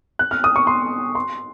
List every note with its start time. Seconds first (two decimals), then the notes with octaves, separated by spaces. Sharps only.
0.19 F#6
0.31 F6
0.44 D#6
0.56 C#6
0.67 C6
1.15 C6